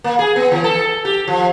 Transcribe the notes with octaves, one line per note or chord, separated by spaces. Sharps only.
A#3
G#4
B3
E3
A4
G4
F3